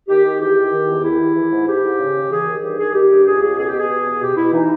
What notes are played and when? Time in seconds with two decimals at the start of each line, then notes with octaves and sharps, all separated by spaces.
0.08 D#3 G4
0.24 D#3
0.40 E2 G4
0.56 D#3
0.72 D#3
0.87 E2
1.03 D#3 E4
1.19 E2
1.35 E3
1.51 G#2
1.66 G#2 G4
1.83 G#2
1.99 C#3
2.14 D#2
2.30 E3 G#4
2.46 D#2
2.57 G#4
2.61 G2 G4
2.78 D#3 G#4
2.93 D#3 G4
3.10 G2
3.25 C#2 G#4
3.41 C#2 G#4
3.57 B2 G#4
3.68 G4
3.73 B2 G#4
3.90 B2
4.05 E2
4.21 B2 G4
4.37 B2 E4
4.53 E3 D#4